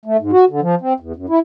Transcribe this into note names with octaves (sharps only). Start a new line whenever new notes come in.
A3
G#2
F#4
D3
F3
C4
E2
F#2
E4